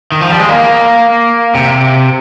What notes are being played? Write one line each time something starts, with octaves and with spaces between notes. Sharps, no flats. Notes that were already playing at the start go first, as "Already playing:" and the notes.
D#3
F3
G3
G#3
A#3
C3